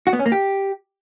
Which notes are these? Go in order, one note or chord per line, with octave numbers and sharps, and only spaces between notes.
F#4
B3
C#4
A#3
G4